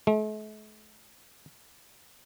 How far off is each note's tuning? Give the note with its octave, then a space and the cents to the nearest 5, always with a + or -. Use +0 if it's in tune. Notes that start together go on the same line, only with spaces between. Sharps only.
A3 -45